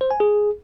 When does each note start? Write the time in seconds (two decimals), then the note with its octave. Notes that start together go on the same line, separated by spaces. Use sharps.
0.01 C5
0.11 G#5
0.20 G#4